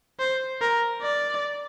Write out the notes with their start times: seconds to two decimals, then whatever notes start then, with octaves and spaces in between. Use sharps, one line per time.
0.20 C5
0.62 A#4
1.02 D5